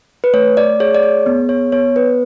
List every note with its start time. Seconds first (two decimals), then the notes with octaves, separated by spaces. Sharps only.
0.24 B4
0.33 A3 C#5
0.57 D5
0.80 G#4 C#5
0.95 D5
1.03 C#5
1.26 B3
1.49 C#5
1.72 B3 C#5
1.96 B4